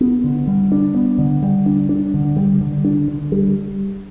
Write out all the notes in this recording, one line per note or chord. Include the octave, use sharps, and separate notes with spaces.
B3
D3
G3
D4
B3
D3
G3
D4
D4
D3
G3
D3
D4
D3
G3